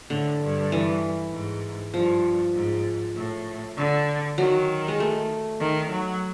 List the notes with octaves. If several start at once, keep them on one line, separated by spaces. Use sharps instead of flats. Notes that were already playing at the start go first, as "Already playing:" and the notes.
A2 D3
G2
E3
G#2
G2 F3
G#2
A2
D3
D#3 F#3
G#3
A3
D#3
F#3